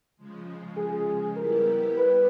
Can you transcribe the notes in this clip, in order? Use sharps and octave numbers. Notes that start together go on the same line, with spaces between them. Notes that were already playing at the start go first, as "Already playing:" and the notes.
C#3 F3 G#3
G#4
G3 B3 E4 G4 A#4
B4